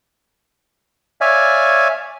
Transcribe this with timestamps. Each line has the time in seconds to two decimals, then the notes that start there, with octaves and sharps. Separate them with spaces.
1.21 C#5 D5 E5 F5 G#5